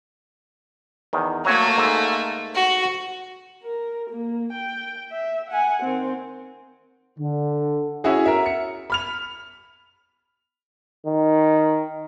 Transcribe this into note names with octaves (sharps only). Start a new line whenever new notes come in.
E2 D#3
F#3 A3 A#3 C#5 A#5
G#2 A4 G#5
F#4
A#4
A#3
G5
E5
F#5 G#5
D#3 C4
D3
C#4 E4 F#4 G#4
A#4 E5
C#7
B5 F6 F7
D#3